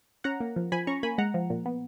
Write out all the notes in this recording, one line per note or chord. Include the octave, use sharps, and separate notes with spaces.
C#4 F#5 A#5
A#3
F3
F3 G#5 B5
C#4 A#5 C#6
A#3 G#5 B5
G#3 F#5 A#5
F3
A#2
B3